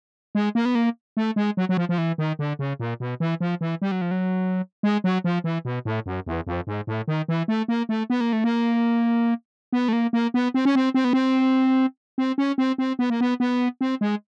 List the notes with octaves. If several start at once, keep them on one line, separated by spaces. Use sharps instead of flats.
G#3
A#3
B3
A#3
A3
G#3
F#3
F#3
F3
F3
E3
D#3
D3
C#3
A#2
B2
E3
F3
E3
G3
F#3
F3
F#3
G#3
F#3
F3
E3
B2
A2
F#2
E2
F2
G#2
A2
D#3
E3
A3
A#3
A3
B3
A#3
A3
A#3
B3
A3
A#3
A#3
B3
C4
C#4
C4
C4
B3
C4
C4
C#4
C4
C4
B3
A#3
B3
B3
C4
G#3